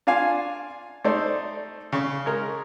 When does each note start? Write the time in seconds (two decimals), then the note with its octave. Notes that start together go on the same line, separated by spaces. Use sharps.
0.07 D4 F4 F5 G#5
1.05 A3 D#4 C5 D5
1.92 C#3 C#6
2.26 G#3 A#4